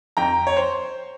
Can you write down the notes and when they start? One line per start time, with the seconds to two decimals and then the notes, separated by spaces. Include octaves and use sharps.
0.17 F2 G5 A#5
0.47 C#5
0.57 C5